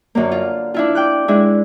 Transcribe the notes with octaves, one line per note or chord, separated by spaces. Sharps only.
F#2 D3 A#3
F4
D4 E4 F4
G5 D6 F#6
G#3 D4 E4